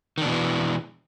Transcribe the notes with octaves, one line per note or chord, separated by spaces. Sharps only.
B2 D#3 E3 D4